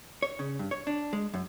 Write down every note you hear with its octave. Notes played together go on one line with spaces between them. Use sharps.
C#5
C#3
G2
C#5
D4
G#3
F#2